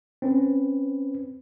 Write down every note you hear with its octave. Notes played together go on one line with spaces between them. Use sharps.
C4 C#4 B4